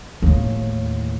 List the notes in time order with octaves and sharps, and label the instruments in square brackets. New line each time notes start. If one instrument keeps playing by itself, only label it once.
[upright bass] D#2 A2